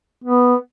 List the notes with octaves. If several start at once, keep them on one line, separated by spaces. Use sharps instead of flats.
B3